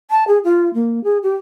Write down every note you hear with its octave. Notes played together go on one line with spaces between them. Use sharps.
A5
G#4
F4
A#3
G#4
G4